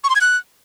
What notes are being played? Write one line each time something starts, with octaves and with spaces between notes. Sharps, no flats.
C#6
C6
G#6
F#6